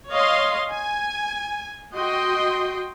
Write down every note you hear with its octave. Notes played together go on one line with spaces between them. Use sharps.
C#5 D#5 F5 C6
G#5
F#4 D#5 G5 C6